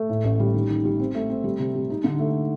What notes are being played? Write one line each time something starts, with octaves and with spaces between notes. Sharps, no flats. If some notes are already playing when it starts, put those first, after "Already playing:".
Already playing: A3
A2
A1
G3
D#3
D#3
G3
C4
A3
C4
G3
C3
G3
D#4
D3
A3